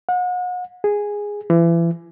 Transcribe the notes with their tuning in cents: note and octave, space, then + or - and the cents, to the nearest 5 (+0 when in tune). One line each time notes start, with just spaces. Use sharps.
F#5 -35
G#4 -10
E3 +30